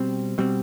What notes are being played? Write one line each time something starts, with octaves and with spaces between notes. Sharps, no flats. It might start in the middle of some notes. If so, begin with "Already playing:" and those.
Already playing: B2 G3 C4
B2 G3 C4